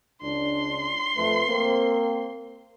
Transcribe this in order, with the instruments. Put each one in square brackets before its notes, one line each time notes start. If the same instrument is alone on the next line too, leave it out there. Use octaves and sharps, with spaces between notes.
[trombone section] C#2 D4 [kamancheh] C6
[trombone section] F2 A3 B4
A#3 C4